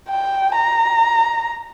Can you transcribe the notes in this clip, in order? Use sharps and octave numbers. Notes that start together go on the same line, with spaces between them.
G5
A#5